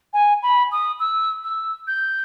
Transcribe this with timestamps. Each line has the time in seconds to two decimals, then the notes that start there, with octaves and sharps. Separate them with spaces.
0.13 G#5
0.43 B5
0.72 D#6
1.00 E6
1.44 E6
1.87 G6